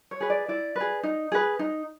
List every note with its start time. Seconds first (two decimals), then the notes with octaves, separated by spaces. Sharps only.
0.11 C#5
0.21 G#4 B4
0.30 D5
0.48 E4 D5
0.76 G#4 B4
1.03 D#4
1.32 G#4 B4
1.59 D#4